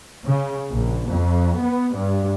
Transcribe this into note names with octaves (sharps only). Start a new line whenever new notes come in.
C#3
A#1
F2
B3
G2